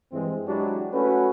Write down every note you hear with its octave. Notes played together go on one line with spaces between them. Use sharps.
G2 E3 G#3 C4
F#3 G#3 D4 E4 F#4 G4
A3 C#4 F#4 B4